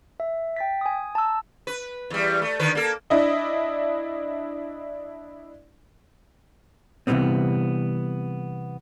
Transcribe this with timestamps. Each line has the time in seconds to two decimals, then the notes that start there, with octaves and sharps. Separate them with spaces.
0.20 E5
0.56 G5 A6 B6
0.81 G#5 D#6
1.15 A5 A#5 E6
1.67 B4
2.10 E2 G3
2.42 A3
2.59 D3 D#3 B4
2.75 A#3 A4
3.10 D4 E4 D#5
7.07 C3 E3 F#3 G3 B3 C4